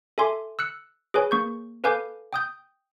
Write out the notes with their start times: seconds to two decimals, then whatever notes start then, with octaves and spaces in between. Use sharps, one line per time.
0.18 A4 E5 G#5 C6 D6
0.59 E6 F#6 C#7
1.14 G#4 B4 C#5 G#5
1.31 A#3 C#6 G6
1.84 A4 B4 F5 G#5 D6 G6
2.33 G5 D#6 G6